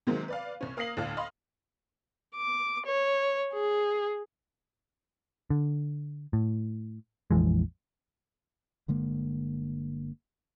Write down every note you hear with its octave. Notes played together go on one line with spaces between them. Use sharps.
C3 D#3 F#3 G#3 A#3 C4
B4 D5 F5
C2 C#4
A#3 F5 D#6 A#6 C7 F#7
D2 A2 D4 F5 F6
D#5 F5 B5 C6
D6
C#5
G#4
D3
A2
A#1 F2 E3 G#3
G1 D3 G#3 A#3